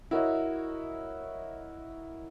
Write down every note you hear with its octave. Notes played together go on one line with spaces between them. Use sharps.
E4 F#4 A#4 C#5 D#5 E5